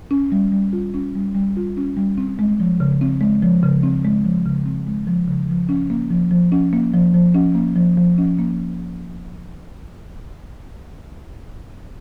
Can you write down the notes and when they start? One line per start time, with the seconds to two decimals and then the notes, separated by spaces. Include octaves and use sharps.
0.11 C#4
0.32 G3
0.52 G3
0.73 F4
0.94 C#4
1.15 G3
1.35 G3
1.57 F4
1.77 C#4
1.97 G3
2.18 C4
2.39 G#3
2.60 F3
2.80 C#3
3.01 C4
3.21 G#3
3.42 F3
3.63 C#3
3.83 C4
4.05 G#3
4.25 F3
4.45 C#3
4.65 C4
4.87 G#3
5.07 F3
5.28 C#3
5.49 F3
5.69 C#4
5.90 A#3
6.11 F3
6.31 F3
6.52 C#4
6.73 A#3
6.94 F3
7.14 F3
7.34 C#4
7.55 A#3
7.76 F3
7.97 F3
8.18 C#4
8.39 A#3